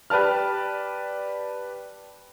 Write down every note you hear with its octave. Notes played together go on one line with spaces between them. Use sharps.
G4 B4 D5 A5 F6